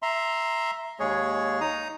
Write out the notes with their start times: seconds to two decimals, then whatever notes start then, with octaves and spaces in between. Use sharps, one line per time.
0.02 E5 A#5 C6
1.00 D#2 G#3 G#4 C#5
1.61 D#4 A#5 D#6